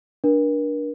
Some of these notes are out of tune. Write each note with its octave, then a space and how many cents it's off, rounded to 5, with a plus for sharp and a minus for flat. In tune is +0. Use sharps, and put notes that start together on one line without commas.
D4 +0 A#4 +40